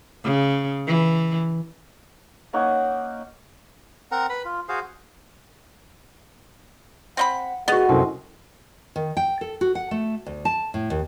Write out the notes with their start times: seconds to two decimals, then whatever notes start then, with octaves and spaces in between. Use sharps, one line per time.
0.24 C#3
0.87 E3
2.53 A#3 C#4 D#4 F#5
4.12 C4 A#4 F#5 A#5
4.30 B4 B5
4.45 F4
4.69 F#4 G#4 C5 F5
7.17 C4 D#5 F#5 B5
7.68 B3 F#4 G#4 D#5
7.89 C2 F#2 C4 A4
8.96 D#3
9.17 G5
9.41 A4
9.61 F#4
9.75 F#5
9.91 A3
10.26 D2
10.45 A5
10.74 A2
10.90 D#2